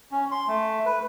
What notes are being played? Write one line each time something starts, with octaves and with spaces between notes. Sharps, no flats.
C#4
C6
A3
B4